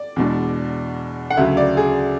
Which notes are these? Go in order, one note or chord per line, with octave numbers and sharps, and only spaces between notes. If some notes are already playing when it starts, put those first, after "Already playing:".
Already playing: D5
E2 B2 G#3 D4
F#5
D2 C#3 F#3 E5
D5
G#4